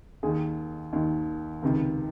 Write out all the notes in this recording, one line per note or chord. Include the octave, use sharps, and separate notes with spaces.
D#2 D#3 G#4
D#2 D#3
C#2 C3 D#3